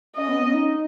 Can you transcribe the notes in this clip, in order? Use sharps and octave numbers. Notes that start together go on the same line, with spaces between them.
C#4 D#5
B3
C#4
D#4